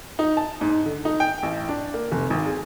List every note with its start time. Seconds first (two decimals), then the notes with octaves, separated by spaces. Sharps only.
0.19 D#4
0.37 A5
0.61 G#2
0.86 D3
1.05 D#4
1.20 G5
1.43 A1
1.69 D4
1.94 A#3
2.12 F1
2.30 G#1
2.46 G#4